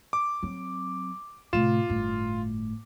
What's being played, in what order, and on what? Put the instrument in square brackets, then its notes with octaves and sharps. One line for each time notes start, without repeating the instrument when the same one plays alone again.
[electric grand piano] D6
[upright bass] F#3 C4
[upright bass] A2 C3 [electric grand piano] F4 E7
[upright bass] G1 A2